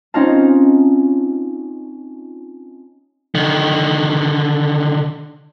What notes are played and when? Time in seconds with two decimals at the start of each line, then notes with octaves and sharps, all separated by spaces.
0.14 C4 C#4 D#4 F4 F5 A5
3.35 D3 D#3